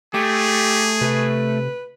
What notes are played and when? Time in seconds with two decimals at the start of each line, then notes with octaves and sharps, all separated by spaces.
0.14 A3 G4 G#4
1.01 C3 B4